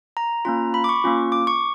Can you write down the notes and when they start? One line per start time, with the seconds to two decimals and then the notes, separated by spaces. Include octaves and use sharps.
0.17 A#5
0.45 A#3 C#4 F4 A#5
0.74 B5
0.84 D6
0.89 C#6
1.04 A#3 C#4 F4
1.32 D6
1.47 C#6